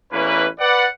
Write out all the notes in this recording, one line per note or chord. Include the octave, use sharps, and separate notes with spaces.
A1 E2 E3 A#3 C#4 B4
B4 D5 F#5